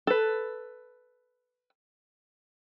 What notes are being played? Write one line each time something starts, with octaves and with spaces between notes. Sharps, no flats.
A4 B4